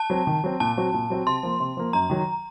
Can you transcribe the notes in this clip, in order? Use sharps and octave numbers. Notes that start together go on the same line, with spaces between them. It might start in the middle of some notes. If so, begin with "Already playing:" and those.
Already playing: A5
F#3 C4
D#3
F#3 C4
A#2 A5
F#3 C4 F#4
A#2
F#3 C4 F#4
C3 C6
F3 A#3
C3
F3 A#3
F#2 A#5
D#3 F#3